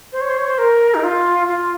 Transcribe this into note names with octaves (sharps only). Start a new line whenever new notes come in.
C5
C#5
C5
C#5
C5
A#4
D#4
F4
F4